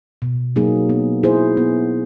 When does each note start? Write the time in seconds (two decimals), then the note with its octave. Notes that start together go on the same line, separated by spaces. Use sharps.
0.22 B2
0.56 F#3 A#3 D#4 G#4
0.89 B3
1.23 E4 G#4 C5
1.57 B3